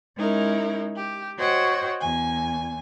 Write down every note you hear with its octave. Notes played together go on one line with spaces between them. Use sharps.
G#3 C#4 D#4 E4 A#4
G4
F#4 C5 C#5 D#5 F#5 G5
E2 G#5